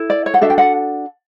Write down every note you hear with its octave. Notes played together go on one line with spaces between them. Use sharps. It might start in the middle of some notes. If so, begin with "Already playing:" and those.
Already playing: E4 A4
D5
C#5
F#5
D4 F#4 A4 E5
G5
F#5